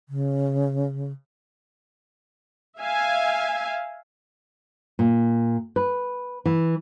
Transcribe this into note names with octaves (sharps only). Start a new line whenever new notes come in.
C#3
E5 F5 G#5
A#2
B4
E3